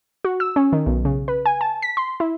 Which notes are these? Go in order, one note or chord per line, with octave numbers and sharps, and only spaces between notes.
F#4
E6
C#4
D#3
B1
C#3
B4
G#5
A5
B6
C6
E4